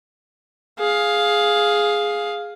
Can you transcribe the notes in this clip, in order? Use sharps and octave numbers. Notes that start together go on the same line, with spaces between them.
G#4 F5